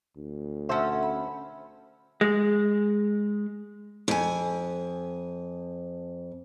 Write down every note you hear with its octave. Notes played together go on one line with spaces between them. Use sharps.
D2
C#4 A4 C5 E5 F#5
B5
G#3
F2 G#5